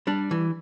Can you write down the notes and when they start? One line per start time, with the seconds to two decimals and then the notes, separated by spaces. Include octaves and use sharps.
0.07 G3 D4
0.31 E3